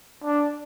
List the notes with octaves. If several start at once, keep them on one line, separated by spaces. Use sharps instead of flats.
D4